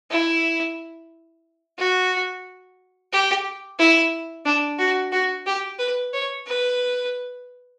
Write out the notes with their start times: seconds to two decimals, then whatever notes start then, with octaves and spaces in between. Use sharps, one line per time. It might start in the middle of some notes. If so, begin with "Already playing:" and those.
0.11 E4
1.78 F#4
3.12 G4
3.79 E4
4.45 D4
4.79 F#4
5.12 F#4
5.46 G4
5.79 B4
6.13 C#5
6.46 B4